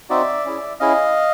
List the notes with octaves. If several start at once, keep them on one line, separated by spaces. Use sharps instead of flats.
C4 D#4 F#4 D5 E5
C#4 E4 G#4
C#4 E4 G#4 D#5 F5